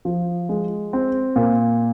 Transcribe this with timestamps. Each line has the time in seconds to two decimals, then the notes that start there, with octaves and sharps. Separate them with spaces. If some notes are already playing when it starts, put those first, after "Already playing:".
0.05 F3
0.49 G#3
0.93 C4
1.36 A#2